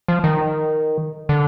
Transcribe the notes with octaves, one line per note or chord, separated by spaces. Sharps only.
F3
D#3
D3